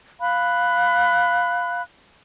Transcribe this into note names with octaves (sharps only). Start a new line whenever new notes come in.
F5 B5 F#6